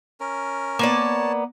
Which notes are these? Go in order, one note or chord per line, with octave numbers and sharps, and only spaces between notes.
C#4 A#4
A#3 B3 C#5 D5 A5